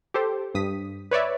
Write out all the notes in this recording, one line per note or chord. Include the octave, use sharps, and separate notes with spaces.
G4 A4 C5
G2 D#6 B6
B4 C#5 D5 E5